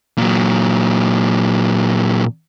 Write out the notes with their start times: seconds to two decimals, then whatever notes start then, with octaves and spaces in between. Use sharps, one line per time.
0.18 A#2 F#3